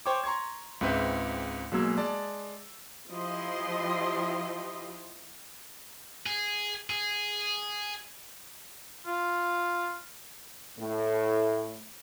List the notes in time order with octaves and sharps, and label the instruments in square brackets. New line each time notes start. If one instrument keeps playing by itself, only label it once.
[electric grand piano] C5 C#5 G5 C#6 D6
A#5 C6 C#6 G#6
C#2 G#2 C4 B4 E5 G6
B1 F#3 G#3 A#3 E6 G#6
G#3 D5 A5
[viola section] F3 E4 G4 D#5 C6
[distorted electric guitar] G#4
G#4
[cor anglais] F4
[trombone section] A2